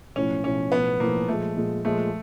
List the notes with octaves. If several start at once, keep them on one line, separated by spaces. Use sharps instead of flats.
B1 A2 F3 C#4
B1 A2 F3 C#4
B1 A2 F3 B3
B1 A2 F3 A#3
A#2 F3 G#3 A3
A#2 F3 G#3
A#2 F3 G#3 A3